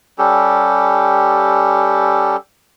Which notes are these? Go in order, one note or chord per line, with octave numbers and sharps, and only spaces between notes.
G3 C#4 G4 A4